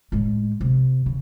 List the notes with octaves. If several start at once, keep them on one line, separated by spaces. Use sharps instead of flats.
A2 G#3
C3
C#3